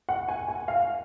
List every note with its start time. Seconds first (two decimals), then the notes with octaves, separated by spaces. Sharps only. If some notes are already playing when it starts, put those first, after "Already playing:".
0.09 F#5
0.28 G#5
0.48 G#5
0.68 F5